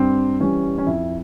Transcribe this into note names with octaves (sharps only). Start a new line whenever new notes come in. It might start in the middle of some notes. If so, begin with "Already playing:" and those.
Already playing: G2 C4
E3 G3 C#4
C#4
F2 E4